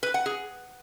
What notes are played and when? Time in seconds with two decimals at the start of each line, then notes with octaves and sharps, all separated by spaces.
0.03 B4
0.14 F#5
0.26 G#4